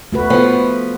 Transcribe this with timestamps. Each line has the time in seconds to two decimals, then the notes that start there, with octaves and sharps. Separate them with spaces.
0.13 A3 F#4 B4
0.30 F3 B3